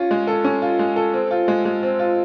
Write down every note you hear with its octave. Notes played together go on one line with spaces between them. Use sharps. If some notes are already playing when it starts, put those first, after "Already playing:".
Already playing: C#4 F4
G#3
A4
C#4
F4
G#3
A4
C4
F4
G#3
G#3
C4
F4